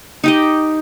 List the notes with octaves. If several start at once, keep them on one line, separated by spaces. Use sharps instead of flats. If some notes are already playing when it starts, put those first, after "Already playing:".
D#4 G4 D#5